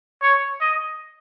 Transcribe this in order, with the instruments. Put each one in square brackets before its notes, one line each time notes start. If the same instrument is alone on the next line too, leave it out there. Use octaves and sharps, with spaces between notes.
[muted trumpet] C#5
D#5